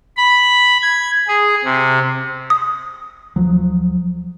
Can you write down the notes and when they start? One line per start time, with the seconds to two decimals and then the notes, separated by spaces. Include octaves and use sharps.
0.17 B5
0.82 G#6
1.28 G#4
1.65 C3
2.50 D#6
3.36 D2 F3 F#3